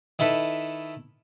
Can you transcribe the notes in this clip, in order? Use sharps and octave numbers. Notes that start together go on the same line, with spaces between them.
D#3 E4 A4 B4